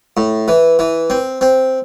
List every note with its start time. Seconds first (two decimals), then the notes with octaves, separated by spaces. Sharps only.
0.17 A2
0.48 E3
0.79 E3
1.10 C4
1.41 C4